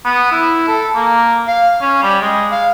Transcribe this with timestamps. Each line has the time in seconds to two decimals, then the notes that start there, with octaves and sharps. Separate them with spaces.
0.05 B3
0.32 E4
0.68 A4
0.95 A#3
1.47 F5
1.82 C#4
2.02 G3
2.22 G#3
2.52 F5